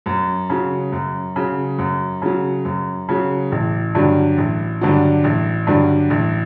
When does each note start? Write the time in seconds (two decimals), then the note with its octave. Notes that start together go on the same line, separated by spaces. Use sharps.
0.06 F#2
0.50 C#3 F#3
0.92 F#2
1.36 C#3 F#3
1.78 F#2
2.22 C#3 F#3
2.65 F#2
3.09 C#3 F#3
3.52 A1
3.95 G2 D3 F#3
4.38 A1
4.81 G2 D3 F#3
5.24 A1
5.67 G2 D3 F#3
6.10 A1